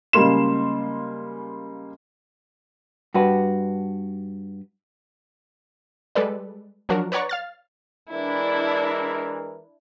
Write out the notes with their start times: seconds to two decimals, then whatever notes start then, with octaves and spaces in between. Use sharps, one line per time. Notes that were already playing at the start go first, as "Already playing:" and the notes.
0.13 C#3 G3 G#3 A#3 C6 E7
3.14 G2 F#4 B4
6.15 G3 G#3 A4 B4 D5
6.89 F3 F#3 D4 F#4 A#4
7.12 B4 C#5 D5 F#5 A#5 C#6
7.29 F5 F6 A6
8.12 E3 G#3 D4 E4 A#4